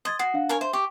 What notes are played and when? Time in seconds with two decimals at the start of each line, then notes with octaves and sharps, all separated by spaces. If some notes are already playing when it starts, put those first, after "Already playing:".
0.05 D#5 C6 G#6 A6
0.19 F#4 D#6 C7
0.34 D4 F5
0.49 A#4 C#5 G#5
0.61 C5 E5
0.73 G4 C#6